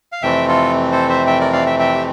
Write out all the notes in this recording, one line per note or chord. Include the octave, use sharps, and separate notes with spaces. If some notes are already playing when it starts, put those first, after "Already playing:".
F5
F2 C3 E3 A3 C4 E5 G5
F4 A4
A4 C5
C5 E5
E5 G5
A#4 D5
D5 F5
E5 G5
E5 G5
G4